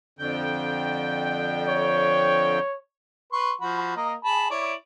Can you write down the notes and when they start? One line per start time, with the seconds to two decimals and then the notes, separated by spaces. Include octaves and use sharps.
0.19 F2 D3 G5
1.68 C#5
3.32 B4 C6 C#6
3.61 F3 F#4 B5
3.96 A#3 A#4 D#5
4.24 G#4 A5 B5
4.50 E4 C#5 D5